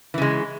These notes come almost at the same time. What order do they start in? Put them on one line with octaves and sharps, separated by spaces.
E3 C#3 G#3